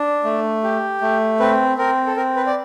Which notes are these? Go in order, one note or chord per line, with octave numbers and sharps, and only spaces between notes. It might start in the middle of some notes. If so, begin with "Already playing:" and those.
Already playing: D4
A3
G4
A3
C4 B4
C4 A#4
A4
C4 A#4
B4
D5